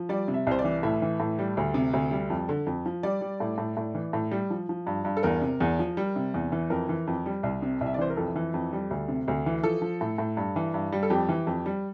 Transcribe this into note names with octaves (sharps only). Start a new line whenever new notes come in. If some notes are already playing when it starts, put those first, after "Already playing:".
Already playing: F3
G3 D5
C3
E5
C2 C5
D5
E3
A2 E5
E3
A2
G3
D2
C3
D2
G3
F2
D3
F2
F3
G3 D5
G3
A2
A2
A2
E3
A2
G3
F3
F3
G2
G2
A4
E2 A#4
C3
E2
F3
G3
C3
E2
E3
F2 A#4
E3
F2
G3
C2
C3
C2
E5
D5
E3 C5
A#4
F2 A4
E3
F2
G3
D2
C3
D2
E3
F3 A4
F3
A2
A2
G2
E3
G2
G3
A4
F2 G4
E3
F2
G3